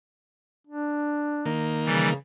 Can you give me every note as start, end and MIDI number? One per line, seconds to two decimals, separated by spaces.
0.67 1.47 62
1.46 2.14 51
1.46 2.14 58
1.85 2.15 49
1.85 2.09 52
1.85 2.09 55